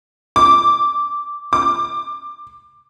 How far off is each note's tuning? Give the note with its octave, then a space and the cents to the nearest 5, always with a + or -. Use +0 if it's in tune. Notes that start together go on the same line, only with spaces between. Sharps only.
D6 -5
D6 +15